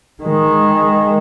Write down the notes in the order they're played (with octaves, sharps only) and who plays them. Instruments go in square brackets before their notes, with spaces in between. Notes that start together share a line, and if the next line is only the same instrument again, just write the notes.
[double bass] D#3 G#3